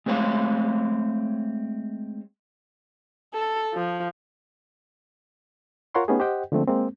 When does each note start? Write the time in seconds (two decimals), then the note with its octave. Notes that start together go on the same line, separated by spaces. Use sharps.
0.06 G#3 A3 C4 C#5 F5
3.34 A4
3.74 F3
5.95 F4 A#4 C#5 F#5 C6 C#6
6.08 A3 B3 C#4 D#4 G4 G#4
6.20 G4 C5 D#5 F#5 G5
6.52 D3 F3 G#3 A3 C4
6.68 G#3 A#3 C4